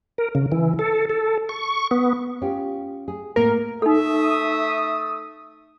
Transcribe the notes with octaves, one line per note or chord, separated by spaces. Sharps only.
A#4
C#3
E3
A4
A4
C#6
B3
C#4 F4 G4
G#4
A2 A#3 A#4
A3 D#4 A4 E5 D#6